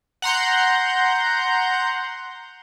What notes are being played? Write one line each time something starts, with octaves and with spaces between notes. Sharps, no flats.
F#5 A#5 C6 G6